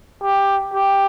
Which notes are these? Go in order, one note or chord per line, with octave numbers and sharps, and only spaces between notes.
G4
G4